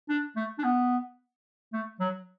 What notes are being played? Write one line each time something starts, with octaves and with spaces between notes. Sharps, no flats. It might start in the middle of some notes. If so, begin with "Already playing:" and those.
D4
A3
D4
B3
A3
F#3